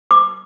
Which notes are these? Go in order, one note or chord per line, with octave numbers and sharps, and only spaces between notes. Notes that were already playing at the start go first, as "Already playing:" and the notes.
D6